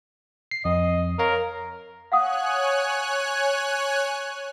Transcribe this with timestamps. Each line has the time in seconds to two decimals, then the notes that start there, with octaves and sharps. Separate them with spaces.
0.51 C7
0.65 F2 D#5
1.19 A#4 C#5 F5
2.12 C#5 F5 F#5 G#5 D#6 F#6